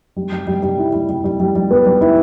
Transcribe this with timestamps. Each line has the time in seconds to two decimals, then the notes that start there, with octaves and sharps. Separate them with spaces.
0.16 G3
0.32 G3
0.47 G3
0.63 G3
0.78 E4
0.93 G3
1.09 G3
1.24 G3
1.40 G3
1.55 G3
1.71 B3
1.86 G3
2.01 E4